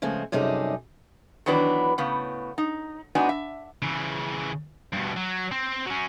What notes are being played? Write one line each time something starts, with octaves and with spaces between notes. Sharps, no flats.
C#3 F3 G#3 A3 C4
F#2 C3 G3 D#4 G#4 A4
D#3 E3 F#3 B3 D4 B4
A2 C#3 B3
D#4
G#2 B3 D4 D#4 F#4 G#5
E5
C#3 E3
G2 B2
F#3
C4
F#3 C#4